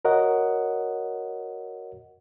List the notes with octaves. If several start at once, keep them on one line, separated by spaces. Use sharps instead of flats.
F#4 A#4 C#5 D#5 F#5